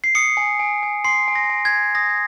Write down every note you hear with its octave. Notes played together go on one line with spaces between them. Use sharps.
C7
D#6 C#7
G#5
G#5
G#5
C6 C7
G#5
A#6
G#5
G#6
G#5
D#6 A#6